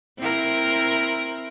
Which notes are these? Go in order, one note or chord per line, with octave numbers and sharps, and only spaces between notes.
C4 E4 A#4